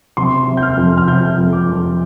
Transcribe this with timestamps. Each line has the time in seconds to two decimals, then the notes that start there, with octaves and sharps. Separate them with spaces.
0.17 C3 C6
0.47 C3
0.57 G6
0.63 F6
0.77 F2
0.98 F6
1.08 C3 G6
1.38 F2
1.53 D6
1.68 F2